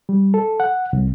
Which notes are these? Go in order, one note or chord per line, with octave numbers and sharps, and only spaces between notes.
G3
A4
F#5
C2